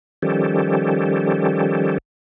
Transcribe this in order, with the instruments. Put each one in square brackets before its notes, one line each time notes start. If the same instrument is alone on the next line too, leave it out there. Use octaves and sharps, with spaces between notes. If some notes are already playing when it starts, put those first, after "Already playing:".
[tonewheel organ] D#3 F3 G3 C#4 G4 A4